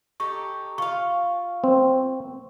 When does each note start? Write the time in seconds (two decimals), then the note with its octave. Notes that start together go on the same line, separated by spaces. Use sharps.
0.20 D#4 G4 A4 C#6
0.78 F4 F5 C#6
1.64 C4